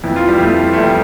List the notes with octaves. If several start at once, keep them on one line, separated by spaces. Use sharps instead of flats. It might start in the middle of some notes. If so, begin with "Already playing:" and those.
F2 E3
F4
G3
F2 E3 A3
A3
F2 E3 G3